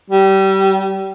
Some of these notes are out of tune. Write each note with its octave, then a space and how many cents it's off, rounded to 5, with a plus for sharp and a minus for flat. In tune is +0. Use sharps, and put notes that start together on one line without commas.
G3 -25